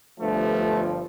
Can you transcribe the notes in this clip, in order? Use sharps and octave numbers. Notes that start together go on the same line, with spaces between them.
G1 G2 F3 A3